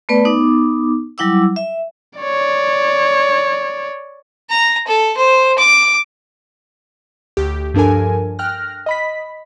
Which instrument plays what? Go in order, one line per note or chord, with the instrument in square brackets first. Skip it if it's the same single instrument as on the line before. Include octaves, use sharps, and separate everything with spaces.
[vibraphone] A3 B3 B4 D5
B3 D#4 D6
F#3 G3 E4 F#5 D6 E6
E5
[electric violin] C#5 D5
[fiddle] A#5
A4
C5
D6
[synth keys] D2 G4
G2 F3 D4 A4 A#4 G#5
G5 F6 F#6 A#6
D#5 B5 B6